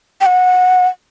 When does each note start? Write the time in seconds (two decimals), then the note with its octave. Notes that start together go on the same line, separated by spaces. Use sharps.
0.21 G5
0.26 F#5